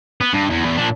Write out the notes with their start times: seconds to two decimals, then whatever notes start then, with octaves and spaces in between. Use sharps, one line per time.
0.21 B3
0.34 G2
0.50 E2
0.65 E2
0.78 A#2 D4